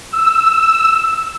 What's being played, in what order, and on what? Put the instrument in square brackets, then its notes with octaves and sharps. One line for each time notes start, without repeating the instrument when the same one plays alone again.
[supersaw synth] E6